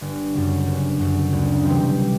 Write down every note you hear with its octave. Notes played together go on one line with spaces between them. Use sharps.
G1
F#2 C#3
G1
F#2 C#3
D2
C3 E3 G3 C4